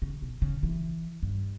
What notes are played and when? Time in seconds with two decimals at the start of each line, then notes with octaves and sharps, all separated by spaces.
0.02 C#3
0.22 B2
0.42 C#3
0.63 E3
1.23 G2